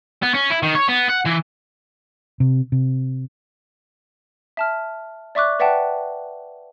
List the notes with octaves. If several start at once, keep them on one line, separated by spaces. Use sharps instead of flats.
B3
C#4
E4
D#3
C#5
B3
F#5
E3
C3
C3
E5 A5 F6
D5 E5 C#6 D6 F#6
B4 D5 E5 F#5 G5 A5